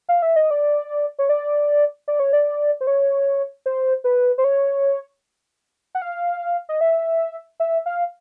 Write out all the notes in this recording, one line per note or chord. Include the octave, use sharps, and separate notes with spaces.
F5
E5
D#5
D5
C#5
D5
D5
C#5
D5
C5
C#5
C5
B4
C5
C#5
F#5
F5
D#5
E5
E5
F5